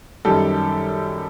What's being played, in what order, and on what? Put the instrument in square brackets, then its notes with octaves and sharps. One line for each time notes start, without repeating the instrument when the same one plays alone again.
[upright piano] F#2 D#3 G3 G4 A4